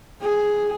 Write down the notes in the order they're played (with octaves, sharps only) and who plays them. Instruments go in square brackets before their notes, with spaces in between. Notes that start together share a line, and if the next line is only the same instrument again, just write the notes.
[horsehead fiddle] G#4